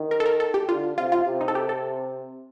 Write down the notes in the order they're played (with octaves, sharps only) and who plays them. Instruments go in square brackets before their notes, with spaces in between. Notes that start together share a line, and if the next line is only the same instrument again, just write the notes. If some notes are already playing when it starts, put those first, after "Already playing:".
Already playing: [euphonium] D#3
[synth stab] A#4
A4
A#4
A4
G4
[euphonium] D3 [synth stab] F4
[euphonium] C3 [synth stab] F4
[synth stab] F4
[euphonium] C3
[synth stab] D#4
A4
G4
A4